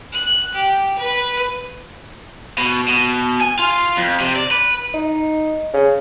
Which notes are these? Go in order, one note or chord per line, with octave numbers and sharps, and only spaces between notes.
F#6
G4
B4
B2
B2
G#5
F4
F2
C3
D5
B4
D#4
C#3